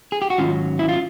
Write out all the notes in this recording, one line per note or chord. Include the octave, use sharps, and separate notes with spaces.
G#4
G4
F#4
G#2 D#3 F#3 C#4 F4
E4
F4